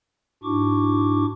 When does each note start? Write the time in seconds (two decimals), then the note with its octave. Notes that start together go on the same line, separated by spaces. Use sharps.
0.44 G#2 D4 E4 F#4 C#6 D6